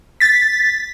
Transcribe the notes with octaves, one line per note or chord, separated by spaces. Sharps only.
A6 B6